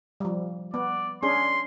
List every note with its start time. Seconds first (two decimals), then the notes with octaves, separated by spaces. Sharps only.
0.20 F3 G3
0.74 B3 D5
1.23 C#4 D4 G#4 C6